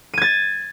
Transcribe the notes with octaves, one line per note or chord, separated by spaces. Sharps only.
G#6 A6 D#7